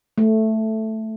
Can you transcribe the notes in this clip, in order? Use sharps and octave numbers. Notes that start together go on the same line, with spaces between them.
A3